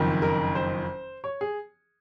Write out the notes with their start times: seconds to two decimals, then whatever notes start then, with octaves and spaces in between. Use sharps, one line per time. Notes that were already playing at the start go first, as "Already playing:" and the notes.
Already playing: F#1 F2 D#3
0.22 A#4
0.55 C5
1.24 C#5
1.41 G#4